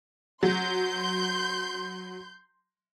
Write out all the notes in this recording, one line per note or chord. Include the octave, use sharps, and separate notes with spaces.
F#3 C6 G6